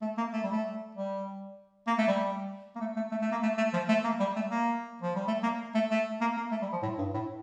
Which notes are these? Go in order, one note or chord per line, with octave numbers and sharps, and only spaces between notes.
A3
A#3
A3
G3
A3
G3
A#3
A3
G3
A#3
A3
A3
A3
A3
A#3
A3
A3
F3
A3
A#3
G3
A3
A#3
F3
G3
A3
A#3
A3
A3
A#3
A#3
A3
G3
F3
A2
G2
A2